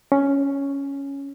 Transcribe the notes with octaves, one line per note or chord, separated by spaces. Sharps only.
C#4